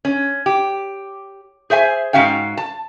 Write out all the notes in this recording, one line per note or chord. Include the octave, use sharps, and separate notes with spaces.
C#4
G4
G#4 C5 E5 G#5
G#2 G3 C#4 F#4 F5 G5
A5